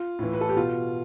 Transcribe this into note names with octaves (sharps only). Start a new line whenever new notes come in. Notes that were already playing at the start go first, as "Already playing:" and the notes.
Already playing: F4
A2 E3
B4
A4
G4
B2 F4